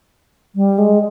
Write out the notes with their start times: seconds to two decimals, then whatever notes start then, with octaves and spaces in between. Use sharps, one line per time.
0.55 G3
0.78 G#3